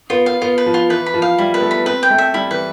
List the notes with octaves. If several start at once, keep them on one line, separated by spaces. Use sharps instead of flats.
B3 F4
B3 F5
B3 F4
B4
F3
F4
E3 B4
B5
F3
F5
G3 E4
B3 B4
A3
B5
C4 B4
G5
A3
E5
G3 E4
E3 B4